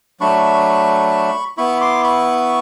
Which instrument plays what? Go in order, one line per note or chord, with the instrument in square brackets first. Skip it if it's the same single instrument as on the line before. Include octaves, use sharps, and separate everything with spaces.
[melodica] F#3 A3 D4 B5 C#6
B3 E4 B5 C#6
C6 D6
B5 C#6